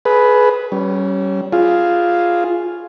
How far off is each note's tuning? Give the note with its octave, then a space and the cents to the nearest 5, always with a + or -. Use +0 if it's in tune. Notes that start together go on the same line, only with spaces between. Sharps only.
G#4 +25 B4 +0
G3 -35 C#4 +0
F4 +0 G#4 +0